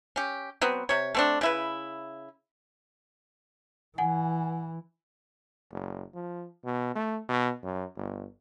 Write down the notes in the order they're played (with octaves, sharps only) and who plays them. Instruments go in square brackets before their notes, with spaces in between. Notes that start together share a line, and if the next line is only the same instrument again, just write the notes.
[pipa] C#4 G4
F#3 B3 C4
C3 C#5
A3 C4 D4
C#3 E4 B4
[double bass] E3 [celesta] F#5 G#5
[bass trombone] F#1
F3
B2
A3
B2
F#2
G1